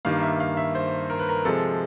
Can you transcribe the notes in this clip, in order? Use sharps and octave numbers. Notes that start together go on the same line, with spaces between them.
G2 D#3 G3 A#3 F5
E5
F5
E5
C5
A#4
B4
A#4
C3 F3 G#3 A4